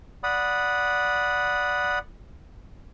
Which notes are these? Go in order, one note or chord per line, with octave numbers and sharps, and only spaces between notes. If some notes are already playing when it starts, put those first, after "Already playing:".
D5 F#5 B5 D#6